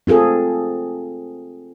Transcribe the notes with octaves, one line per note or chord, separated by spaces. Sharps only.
C4 F4 G#4 A4